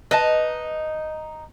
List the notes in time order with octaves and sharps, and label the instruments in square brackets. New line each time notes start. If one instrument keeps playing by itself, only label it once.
[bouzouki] D#4 [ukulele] B4 D#5 A5